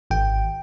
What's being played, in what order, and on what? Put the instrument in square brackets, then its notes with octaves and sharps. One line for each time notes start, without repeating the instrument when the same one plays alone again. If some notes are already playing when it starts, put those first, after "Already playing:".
[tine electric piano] G#1 G5